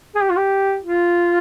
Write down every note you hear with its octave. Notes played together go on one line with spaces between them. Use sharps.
G#4
G4
F4
G4
F4